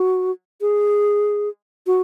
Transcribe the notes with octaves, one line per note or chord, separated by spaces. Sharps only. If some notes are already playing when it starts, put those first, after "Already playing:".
Already playing: F#4
G#4
F#4